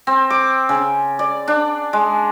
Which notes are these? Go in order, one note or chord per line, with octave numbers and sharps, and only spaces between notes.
C4
D6
C#3
D5
D4
G#3